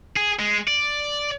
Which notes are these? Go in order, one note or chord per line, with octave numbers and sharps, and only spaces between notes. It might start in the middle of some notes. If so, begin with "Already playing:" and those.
G#4
G#3
D5